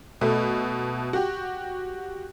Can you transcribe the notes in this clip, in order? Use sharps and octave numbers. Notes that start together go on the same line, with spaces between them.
B2 A3
F#4 G4